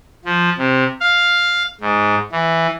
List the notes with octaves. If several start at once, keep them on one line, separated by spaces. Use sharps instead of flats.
F3
C3
F5
G#2
E3